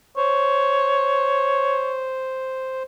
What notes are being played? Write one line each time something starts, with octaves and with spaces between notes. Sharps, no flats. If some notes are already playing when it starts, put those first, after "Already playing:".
C5 C#5